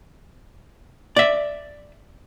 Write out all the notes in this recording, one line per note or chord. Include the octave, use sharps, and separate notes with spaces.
D5 E5